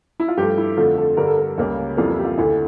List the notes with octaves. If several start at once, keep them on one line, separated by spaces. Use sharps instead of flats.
E4
F4
G2 F3 A3 G4
E4
F2 D3 A3 F4
A4
G2 D3 G3 A#4
A4
A#4
C#2 C#3 G3 A#3
F2 E3 G3 A#3 F4
E4
G4
F4
D2 D3 A3 E4